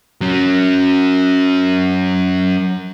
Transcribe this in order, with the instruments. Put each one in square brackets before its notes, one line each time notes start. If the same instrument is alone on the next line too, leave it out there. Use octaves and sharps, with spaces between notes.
[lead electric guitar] F#3 C#4